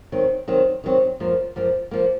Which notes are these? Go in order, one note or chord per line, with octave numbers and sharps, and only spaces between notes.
D#3 F#3 C4
D#3 F#3 C4
D#3 F#3 C4
F#2 F3 A#3
F#2 F3 A#3
F3 A#3